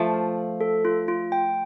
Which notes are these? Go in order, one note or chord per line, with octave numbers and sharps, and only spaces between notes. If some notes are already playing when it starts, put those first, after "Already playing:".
Already playing: F3 A3 A5
F5
F5
A4
F4
F4
G5